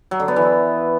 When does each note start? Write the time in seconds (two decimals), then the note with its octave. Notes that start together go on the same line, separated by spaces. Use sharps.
0.11 F#3
0.20 D3
0.28 B3
0.36 E3